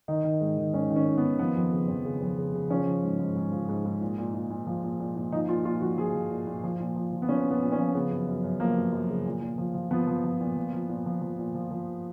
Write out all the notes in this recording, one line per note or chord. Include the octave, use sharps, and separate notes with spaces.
D#3 D#4
D#3
G#2
D#3
G#2 C#4
D#3
C#4
D#3
B3
D#3
F3 B3
F2
C#3
F2
C#3
F2
C#3
C#3
F3 C#4
F3
G#2
G#2
G#2
F3
G#2
G#2
A#2
A#2
A#2
A#2
F3
A#2
A#2
A#2
F3 D#4
A#2 F4
A#2 F4
F3 F#4
F3 G#4
F3
A#2
A#2
F3
A#2
F3
F3
B3
F3 C#4
A#2
B3
A#2
C#4
F3
C#3 B3
F#2
F#2
F#2
F3 A#3
F#2
F#2
C#3
A#2
A#2
F3
F3
F3 B3
F3
F3
A#2
F3
F3
A#2
F3
F3
A#2
F3
F3